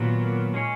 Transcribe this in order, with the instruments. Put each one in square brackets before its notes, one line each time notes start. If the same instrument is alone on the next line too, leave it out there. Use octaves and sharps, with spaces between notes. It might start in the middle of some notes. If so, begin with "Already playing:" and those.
Already playing: [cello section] A#2 [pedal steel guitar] D#3 F#3 B3 F#4
[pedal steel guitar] G#3 C#4 G#4 C#5